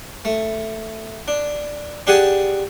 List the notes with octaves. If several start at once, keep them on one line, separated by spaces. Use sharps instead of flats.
A3
D4
D4 G4 G#4 F#5 G#5 A5